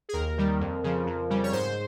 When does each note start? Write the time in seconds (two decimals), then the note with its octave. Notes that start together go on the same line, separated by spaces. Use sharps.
0.09 G#4
0.13 D#2 A#4
0.38 D#3 G3
0.60 F2
0.83 C#3 F3
1.06 F2
1.30 C#3 G3
1.43 C#5
1.52 G#2 C5